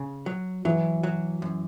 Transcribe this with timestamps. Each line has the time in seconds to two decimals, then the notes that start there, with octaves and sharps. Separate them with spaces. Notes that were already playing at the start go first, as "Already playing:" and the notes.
Already playing: C#3
0.26 F#3
0.65 E3 F#3
1.03 F#3
1.42 F#2